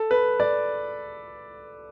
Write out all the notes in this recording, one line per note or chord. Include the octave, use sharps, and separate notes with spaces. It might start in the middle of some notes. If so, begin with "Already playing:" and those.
Already playing: A4
B4
D5